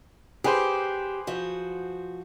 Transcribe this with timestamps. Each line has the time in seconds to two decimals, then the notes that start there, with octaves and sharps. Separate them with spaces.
0.44 G4 G#4 B4 C5
1.27 F3 F#4